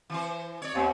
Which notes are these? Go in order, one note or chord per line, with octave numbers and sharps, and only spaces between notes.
E3 C5
C#5 D5
D#2 B3